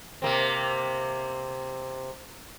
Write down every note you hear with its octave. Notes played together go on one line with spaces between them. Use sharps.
C3 A#3 C4